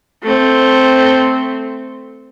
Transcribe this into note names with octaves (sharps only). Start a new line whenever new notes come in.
A3 C4